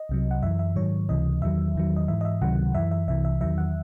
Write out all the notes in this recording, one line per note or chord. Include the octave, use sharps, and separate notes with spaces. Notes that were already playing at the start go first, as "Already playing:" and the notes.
Already playing: D#5
C2 C3 F#3
F#5
F#2 E3 E5
E5
G#2 D#3 F#3 C#5
C#2 C3 E3 D#5
E2 D#3 F#3 E5
E2 D#3 F#3
D#5
G#2 E3 E5
D#5
E5
C#2 C3 D#3 F#3 F#5
F#2 E3 E5
E5
C2 C3 E3 E5
E5
E2 D#3 F#3 E5
F#5